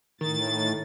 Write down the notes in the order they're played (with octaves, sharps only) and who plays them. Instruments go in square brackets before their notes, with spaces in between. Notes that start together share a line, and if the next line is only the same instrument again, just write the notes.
[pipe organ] A2 A6 [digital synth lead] D#3